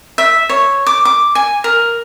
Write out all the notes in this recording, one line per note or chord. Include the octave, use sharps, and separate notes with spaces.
E5
C#5
D6
D6
G#5
A#4